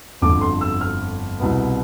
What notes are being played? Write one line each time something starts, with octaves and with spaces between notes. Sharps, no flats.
G1 F2 D3 D6
C6
E6
F6
C2 B2 B3